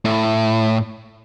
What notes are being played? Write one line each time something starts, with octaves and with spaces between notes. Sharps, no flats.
A2